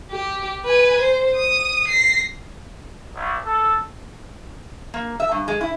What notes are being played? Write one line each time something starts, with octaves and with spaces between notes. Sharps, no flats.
G4
B4 G#5
C5
D#6
A#6 C7
B1
A4
A#3
E5
G2
G#3
E4